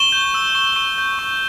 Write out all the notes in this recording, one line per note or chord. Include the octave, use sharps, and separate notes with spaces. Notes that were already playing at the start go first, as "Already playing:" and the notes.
Already playing: C#6 E7 G7
G6
E6
C#6
C#6
G6
C#6